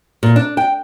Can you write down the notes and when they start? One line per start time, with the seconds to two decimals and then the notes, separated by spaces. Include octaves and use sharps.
0.23 A#2
0.36 D4
0.57 G5